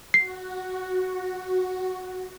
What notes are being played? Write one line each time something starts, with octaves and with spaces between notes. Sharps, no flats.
F#4 C7